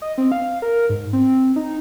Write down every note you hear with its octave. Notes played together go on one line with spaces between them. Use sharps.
D#5
C4
F5
A#4
G#2
C4
D#4